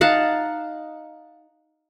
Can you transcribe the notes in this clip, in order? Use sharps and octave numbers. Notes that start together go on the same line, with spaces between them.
D#4 F5 F#5 A5